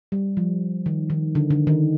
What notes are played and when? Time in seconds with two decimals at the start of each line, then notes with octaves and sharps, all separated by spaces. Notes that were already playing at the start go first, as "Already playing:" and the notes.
0.12 G3
0.37 F3
0.86 D#3
1.10 D#3
1.35 D3
1.50 D3
1.67 D#3